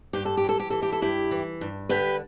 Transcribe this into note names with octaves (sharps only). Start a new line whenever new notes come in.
G2 G4
A4
G4
E3 A4
G4
E3 A4
E4 G4
A4
G2 E4 G4
E3
G2
D3 G4 B4